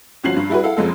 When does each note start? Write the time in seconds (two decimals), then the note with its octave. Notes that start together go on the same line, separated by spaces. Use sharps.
0.24 G1 F3 C#4 F#4 C7 F#7
0.36 G2
0.50 G3 E4 F#4 G#4 B4
0.63 E4 A4 F5 F#5
0.77 F#1 F2 G#3 A4